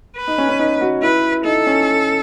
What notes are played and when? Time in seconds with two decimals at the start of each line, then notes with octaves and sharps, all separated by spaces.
0.17 B4
0.28 D#4
0.38 C#4
0.49 C#4
0.59 D#4
0.81 F#4
1.02 E4 B4
1.45 D#4 A4
1.67 C#4